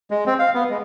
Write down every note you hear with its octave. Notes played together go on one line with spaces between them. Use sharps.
G#3
C4
F5
B3
G#3